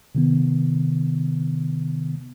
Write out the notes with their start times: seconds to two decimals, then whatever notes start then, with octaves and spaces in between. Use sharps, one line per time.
0.15 C3 D#3 B3